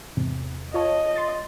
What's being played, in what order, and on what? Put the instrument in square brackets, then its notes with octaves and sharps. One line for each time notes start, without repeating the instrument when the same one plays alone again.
[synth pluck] E2 G#2 C3
[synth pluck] F4 C#5 A5 [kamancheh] D#5
[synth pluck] C6 A6